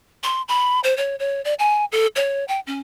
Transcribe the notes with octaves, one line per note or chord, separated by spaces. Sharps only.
C6
B5
C5
C#5
C#5
D5
G#5
A4
C#5
G5
C#4